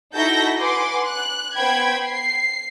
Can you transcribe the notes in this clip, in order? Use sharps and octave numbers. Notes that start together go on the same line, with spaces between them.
D#4 E4 F#4 A4 G6 A#6
B4 F#5 G#5 C6 D6
F#6
B3 C5 G5 B5 G#6
C7